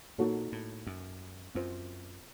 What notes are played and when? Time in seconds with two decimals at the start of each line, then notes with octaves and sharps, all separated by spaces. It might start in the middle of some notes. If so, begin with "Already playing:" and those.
0.18 A#2 A#3 D#4 F#4 A4 C#5
0.52 A2
0.87 F#2
1.55 F#2 C4 F4 C5